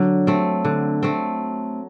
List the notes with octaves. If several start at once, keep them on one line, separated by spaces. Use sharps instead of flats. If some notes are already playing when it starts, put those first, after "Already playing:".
Already playing: D3 F#3
A3 C4
D3
A3 C4